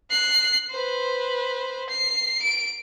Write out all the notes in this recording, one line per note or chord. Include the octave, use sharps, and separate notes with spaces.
F#6 C7
B4 C5
C7
D7